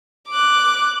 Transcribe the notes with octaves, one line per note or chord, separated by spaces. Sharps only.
D6 F#6